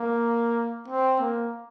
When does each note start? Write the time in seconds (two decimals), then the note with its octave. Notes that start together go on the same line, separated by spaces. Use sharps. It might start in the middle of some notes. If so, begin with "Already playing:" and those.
Already playing: A#3
0.88 C4
1.20 A#3